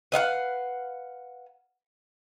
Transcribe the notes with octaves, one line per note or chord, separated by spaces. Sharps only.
B4 D#5 F5 F#5